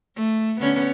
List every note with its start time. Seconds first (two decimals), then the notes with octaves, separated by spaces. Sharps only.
0.16 A3
0.60 D3 B3 C#4